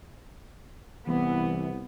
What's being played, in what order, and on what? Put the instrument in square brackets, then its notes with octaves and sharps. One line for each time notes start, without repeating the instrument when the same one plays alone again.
[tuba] C2 [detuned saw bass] E3 [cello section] B3